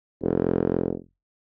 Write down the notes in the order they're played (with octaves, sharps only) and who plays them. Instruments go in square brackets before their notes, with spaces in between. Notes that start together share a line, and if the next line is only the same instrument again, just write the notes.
[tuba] F1